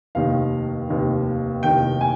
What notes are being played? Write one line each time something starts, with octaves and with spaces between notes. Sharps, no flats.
F1 D#2 D#3 F5
F1 D#2 D#3
F1 D#2 D#3 G5
G#5